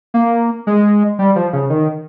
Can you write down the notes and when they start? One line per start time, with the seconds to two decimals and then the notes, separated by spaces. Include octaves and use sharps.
0.14 A#3
0.67 G#3
1.19 G3
1.36 F3
1.53 C#3
1.70 D#3